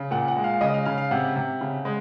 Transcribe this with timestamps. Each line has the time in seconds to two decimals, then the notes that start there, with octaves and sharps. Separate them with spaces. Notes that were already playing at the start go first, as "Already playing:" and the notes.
Already playing: C#3
0.11 A#2 F#5
0.28 F#5
0.36 G#3
0.44 F5
0.61 C#3 D#5
0.74 F5
0.85 C#3 F5
0.98 F5
1.11 C3 F#5
1.36 C3
1.61 C#3
1.85 G#3